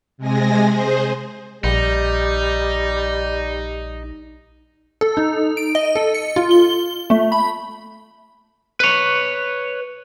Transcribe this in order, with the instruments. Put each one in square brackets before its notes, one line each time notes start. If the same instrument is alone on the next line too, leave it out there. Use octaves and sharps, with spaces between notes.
[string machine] C3 G#3 G#5 A#6
G#4 C5
[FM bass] A#1 [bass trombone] G3 [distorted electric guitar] D#4
[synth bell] A4
D#4
D7
D#5
A4
C#7
F4
G7
A3
B5
[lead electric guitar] B4 C#5